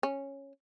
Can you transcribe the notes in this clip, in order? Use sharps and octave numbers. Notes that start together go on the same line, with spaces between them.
C#4